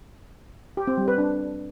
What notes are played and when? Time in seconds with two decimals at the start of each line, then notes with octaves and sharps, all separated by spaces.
0.77 G4
0.87 C4
0.98 G3
1.08 B4
1.18 D4